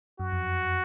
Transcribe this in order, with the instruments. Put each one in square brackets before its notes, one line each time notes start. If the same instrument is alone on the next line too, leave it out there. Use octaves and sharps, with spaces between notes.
[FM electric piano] F#2 [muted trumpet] F#4
[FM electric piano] F2